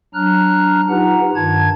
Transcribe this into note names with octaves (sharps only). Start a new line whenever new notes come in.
F#3 D4 A#5 F6 F#6
D#4 F4 G4 B4 F#5 A#5
G2 D#3 A5 G#6